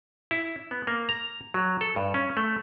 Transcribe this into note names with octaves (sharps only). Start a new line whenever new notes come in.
E4
B3
A#3
A#5
F#3
A4
G2
C#4
A3